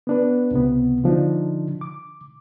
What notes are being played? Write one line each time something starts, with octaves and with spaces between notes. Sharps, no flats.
B3 D4 B4
C#2 C3 B3
D3 F3 D4 D#4
D6